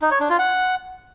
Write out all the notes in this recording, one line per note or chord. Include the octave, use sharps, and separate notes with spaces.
D#4
C#5
D4
F4
F#5